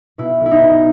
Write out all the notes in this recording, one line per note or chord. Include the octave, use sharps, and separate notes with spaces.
B2 E4
B1
E4
D#4
B2